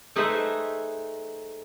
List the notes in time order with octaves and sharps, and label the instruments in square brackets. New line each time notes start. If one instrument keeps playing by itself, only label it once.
[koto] A3 D#4 G#4 B4 C5 E5